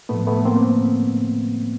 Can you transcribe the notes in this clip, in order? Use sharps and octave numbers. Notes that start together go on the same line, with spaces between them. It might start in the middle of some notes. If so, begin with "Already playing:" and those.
A2 F3 A3 B3
A3 B3
A#3 C4